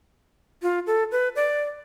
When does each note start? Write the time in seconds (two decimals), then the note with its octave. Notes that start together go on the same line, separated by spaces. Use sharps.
0.62 F4
0.87 A4
1.12 B4
1.36 D5